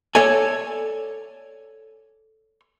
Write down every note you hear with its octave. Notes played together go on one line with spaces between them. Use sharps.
A4 C#5 D5 G#5